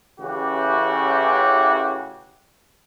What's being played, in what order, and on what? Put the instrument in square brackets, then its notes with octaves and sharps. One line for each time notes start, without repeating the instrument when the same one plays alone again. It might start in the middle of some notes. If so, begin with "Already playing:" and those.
[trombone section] A1 C#3 E3 F#4 G4